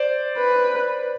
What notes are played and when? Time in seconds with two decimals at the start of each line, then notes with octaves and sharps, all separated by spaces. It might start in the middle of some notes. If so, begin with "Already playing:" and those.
Already playing: C5 D5
0.38 B4